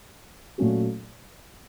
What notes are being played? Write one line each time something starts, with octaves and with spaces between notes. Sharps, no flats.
A#2 F#3 A3 C#4 F#4